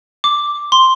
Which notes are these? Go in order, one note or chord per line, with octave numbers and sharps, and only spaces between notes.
D6
C6